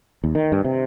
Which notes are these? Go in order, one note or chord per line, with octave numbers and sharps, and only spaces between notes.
D#2
D#3
G2
C3